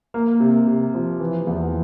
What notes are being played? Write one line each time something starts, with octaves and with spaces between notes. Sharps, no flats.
A#3
C3
C3
F3
E3
E2